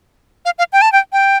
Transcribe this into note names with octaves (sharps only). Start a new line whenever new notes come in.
F5
F5
G5
A5
G5
G5